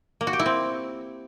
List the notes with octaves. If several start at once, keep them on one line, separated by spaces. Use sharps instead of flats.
A#3
F#4
G4
E4
C4